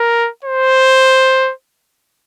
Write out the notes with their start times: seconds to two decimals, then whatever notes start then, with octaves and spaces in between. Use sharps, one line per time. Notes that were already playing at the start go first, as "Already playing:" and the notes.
Already playing: A#4
0.45 C5